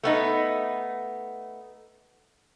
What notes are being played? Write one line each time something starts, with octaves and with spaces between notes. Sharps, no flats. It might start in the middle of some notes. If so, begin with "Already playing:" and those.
A3 B3 D#4